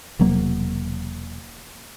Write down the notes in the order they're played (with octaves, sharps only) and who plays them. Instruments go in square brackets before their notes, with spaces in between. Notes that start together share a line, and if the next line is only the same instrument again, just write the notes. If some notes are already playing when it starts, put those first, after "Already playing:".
[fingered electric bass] E1 C3 F#3 A#3